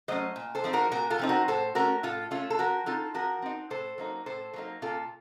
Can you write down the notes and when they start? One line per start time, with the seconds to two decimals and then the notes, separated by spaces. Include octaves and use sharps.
0.08 F#3 A3 C#4 C5 D#5
0.36 A#2
0.55 A4 C5
0.64 F3 C4 D#4
0.73 F#4 A#4
0.92 A#2 F#4 A#4
1.10 F4 A4
1.19 F3 C4 D#4
1.29 F#4 A#4
1.48 A2 A4 C5
1.75 A3 C#4 F#4 A#4
2.03 A2 F4 A4
2.31 A3 C#4 F4 A4
2.50 A4
2.59 F3 F#4 A#4
2.86 C4 D#4 F4 A4
3.14 F3 F#4 A#4
3.42 C4 D#4
3.70 A2 A4 C5
3.98 F#3 A#3 D#4
4.26 A2 A4 C5
4.54 F#3 A#3 D#4
4.82 A#2 F4 A4